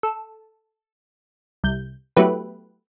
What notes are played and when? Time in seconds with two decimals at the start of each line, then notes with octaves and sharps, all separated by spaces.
0.03 A4
1.64 C2 G6
2.16 F#3 A3 B3 E4 G4 B4